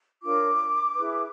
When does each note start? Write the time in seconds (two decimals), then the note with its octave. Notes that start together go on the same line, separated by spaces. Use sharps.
0.22 D4 F4 A#4 C#5 D6
0.97 E4 G#4 B4